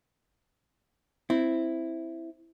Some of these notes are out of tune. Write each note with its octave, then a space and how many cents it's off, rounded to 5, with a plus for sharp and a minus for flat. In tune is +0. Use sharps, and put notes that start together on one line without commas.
C4 +0 E4 +0